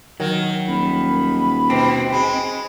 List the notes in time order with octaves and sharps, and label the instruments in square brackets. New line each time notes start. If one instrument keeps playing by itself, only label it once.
[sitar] D#3 [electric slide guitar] F#3
[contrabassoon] D#1 [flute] B5
[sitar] B2 [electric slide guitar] C4
[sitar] G#3